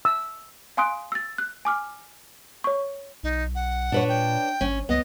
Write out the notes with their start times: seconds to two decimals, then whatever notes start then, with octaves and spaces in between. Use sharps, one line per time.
0.05 E6
0.77 F5 G#5 C6 D#6 F#6 D7
1.12 E6 A6
1.38 F#6
1.65 G#5 D6 F6
2.64 C#5 C#6
3.23 B1 D#4
3.55 F#5
3.92 A#2 D4 B4 C#5
4.08 G5
4.61 G#1 C#4
4.89 C#2 B3 D#5